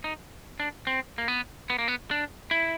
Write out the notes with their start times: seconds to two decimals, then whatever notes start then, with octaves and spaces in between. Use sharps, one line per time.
0.04 D#4
0.60 D4
0.87 C4
1.18 A#3
1.28 B3
1.70 B3
1.78 A#3
1.88 B3
2.11 D4
2.51 E4